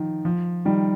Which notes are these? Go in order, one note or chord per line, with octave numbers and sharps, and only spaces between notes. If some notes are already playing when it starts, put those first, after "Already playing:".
Already playing: D#3 F3
F3
D#3 G3